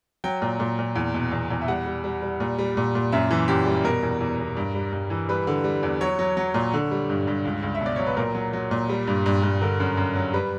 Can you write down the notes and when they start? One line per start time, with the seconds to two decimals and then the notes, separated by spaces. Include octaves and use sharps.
0.24 F#3 G5
0.42 A#2
0.60 A#2
0.79 A#2
0.96 E2
1.14 B2
1.32 E2
1.50 E2
1.62 E5
1.68 G3 F#5
1.86 G3
2.04 G3
2.22 G3
2.40 A#2
2.58 G3
2.77 A#2
2.95 A#2
3.12 F#2 E5
3.31 E3
3.48 F#2 G4
3.66 G3
3.84 B2 A#4
4.03 E2
4.21 E2
4.39 E2
4.57 G2
4.75 G3
4.93 G2
5.10 E3
5.29 G3 B4
5.47 D3
5.64 G3
5.83 E2
6.00 F#3 C#5
6.19 F#3
6.37 F#3
6.54 A#2
6.73 D3
6.91 G3
7.09 G2
7.27 G2
7.45 C#2
7.63 C#2
7.75 E5
7.81 B2 D5
7.96 F#3 C#5
8.07 B4
8.17 A#2 A#4
8.35 F#3
8.53 F#3
8.71 A#2
8.89 G3
9.07 G2
9.26 G2
9.43 G2
9.61 D3 A#4
9.80 F#2
9.97 F#2
10.16 F#3
10.33 G3 B4